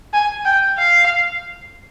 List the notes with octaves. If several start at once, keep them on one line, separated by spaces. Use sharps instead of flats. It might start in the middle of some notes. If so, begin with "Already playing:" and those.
G#5
G5
F5